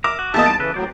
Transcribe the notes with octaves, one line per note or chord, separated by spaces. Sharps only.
A#4 E5 A#5 D6
F#4
E2 A#3 D#5 E5 A5
G3 D#4 D7
C#3 E3 A4 B4
A2 F#3 C4 C5 D5